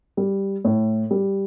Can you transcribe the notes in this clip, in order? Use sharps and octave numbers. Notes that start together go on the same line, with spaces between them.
G3
A2
G3